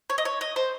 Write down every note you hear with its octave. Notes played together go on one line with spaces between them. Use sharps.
C#5
D#5
C#5
D#5
C5